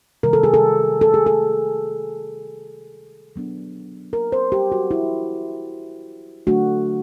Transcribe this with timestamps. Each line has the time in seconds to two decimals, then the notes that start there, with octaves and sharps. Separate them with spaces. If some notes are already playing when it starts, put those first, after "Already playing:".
0.23 C3 D#3 G3 A#4
0.33 A4
0.43 G#4
0.54 A4
1.01 A4
1.14 G#4
1.26 A4
3.36 F#3 B3 D4
4.13 A#4
4.32 C5
4.52 G4
4.72 F#4
4.91 E4
6.47 D3 F#3 A3 D4 F#4